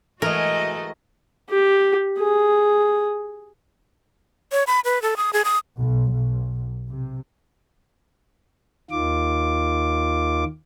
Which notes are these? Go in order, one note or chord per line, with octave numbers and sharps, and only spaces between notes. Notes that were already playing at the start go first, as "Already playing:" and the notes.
E3 G#3 A3 F#4 A#4 D#5
G4
G#4
C#5
B5
B4
A4
D#6
G#4
D#6
B1
B1
C3
D#2 D#3 F4 D6